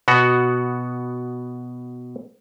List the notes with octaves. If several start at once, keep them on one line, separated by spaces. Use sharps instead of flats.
B2 B3 F#4 F#5